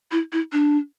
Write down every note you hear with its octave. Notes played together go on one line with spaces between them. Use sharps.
E4
E4
D4